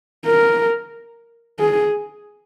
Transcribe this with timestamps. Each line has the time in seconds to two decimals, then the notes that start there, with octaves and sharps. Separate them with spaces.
0.26 A#4
1.60 G#4